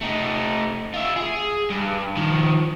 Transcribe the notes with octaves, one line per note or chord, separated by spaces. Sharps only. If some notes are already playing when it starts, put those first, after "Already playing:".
A3 D#4
F4 E5
G#4
G2
D#3 F3